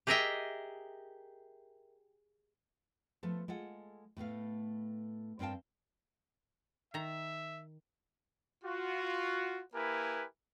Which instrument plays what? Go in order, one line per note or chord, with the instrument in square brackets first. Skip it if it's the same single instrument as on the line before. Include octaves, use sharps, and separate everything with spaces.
[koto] G4 G#4 A#4 D#5 E5 G5
[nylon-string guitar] F3 A3 B3 A4
G#3 F4 A4 F#5
A2 A3 B3 F5
G2 C4 A#4 F5 G5 A5
[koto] D#3 A#5 [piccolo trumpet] E5
[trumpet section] F4 F#4
A#3 E4 G4 A#4 B4 G#5